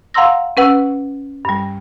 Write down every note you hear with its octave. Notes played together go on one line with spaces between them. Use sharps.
F5 F#5 A#5 C6 E6 A#6
C#4 B4 F#5 E6
G2 G3